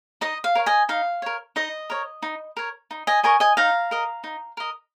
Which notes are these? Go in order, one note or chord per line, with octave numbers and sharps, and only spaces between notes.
D#4 D#5
F5
A#4 C#5
D#5 G#5
D#4 F5
A#4 C#5
D#4 D#5
A#4 C#5
D#4
A#4 C#5
D#4
D#5 G#5
A#4 D#5 G#5 C#6
D#5 G#5
D#4 F5 A#5
A#4 D#5
D#4
A#4 D#5